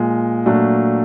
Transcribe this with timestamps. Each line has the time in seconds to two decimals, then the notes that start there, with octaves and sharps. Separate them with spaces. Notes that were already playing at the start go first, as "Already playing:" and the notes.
Already playing: A#2 F3 G#3
0.46 A#2 F#3 A3 D4